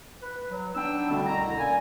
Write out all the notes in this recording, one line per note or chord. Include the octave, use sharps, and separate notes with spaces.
B4
F#3
B3 D4 D#4 G5 E6
B2 D3 G3 A3 C4
C2 B2 D3 E4 A#5
A#3 C#4 A#4 D5 G#5